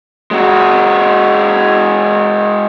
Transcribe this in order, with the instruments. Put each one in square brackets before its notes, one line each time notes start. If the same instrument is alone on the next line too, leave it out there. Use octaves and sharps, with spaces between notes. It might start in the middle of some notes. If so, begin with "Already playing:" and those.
[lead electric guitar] G#3 F#4